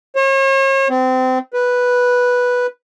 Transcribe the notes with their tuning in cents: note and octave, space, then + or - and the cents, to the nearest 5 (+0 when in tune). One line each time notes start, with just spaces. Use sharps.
C#5 -40
C4 -25
B4 -5